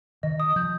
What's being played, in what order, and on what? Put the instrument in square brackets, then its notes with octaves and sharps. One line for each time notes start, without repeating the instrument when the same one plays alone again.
[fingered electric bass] D#3 [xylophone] D#5
[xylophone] D#6
[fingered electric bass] F3 [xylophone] G6